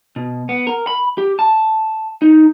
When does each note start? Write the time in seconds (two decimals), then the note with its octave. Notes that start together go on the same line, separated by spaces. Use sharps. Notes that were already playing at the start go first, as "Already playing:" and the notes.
0.16 B2
0.49 B3
0.67 A#4
0.87 B5
1.18 G4
1.39 A5
2.22 D#4